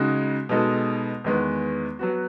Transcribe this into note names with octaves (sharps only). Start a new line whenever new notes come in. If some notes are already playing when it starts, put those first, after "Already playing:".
Already playing: C#3 G#3 D#4 F#4
B2 G#3 D#4 A4
E2 D#3 G#3 B3
F#3 B3 F#4